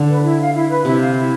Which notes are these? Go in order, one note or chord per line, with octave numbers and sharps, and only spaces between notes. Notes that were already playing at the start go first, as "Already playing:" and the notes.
Already playing: D3
B4
E4
F5
E4
B4
C3 E4
F5
E4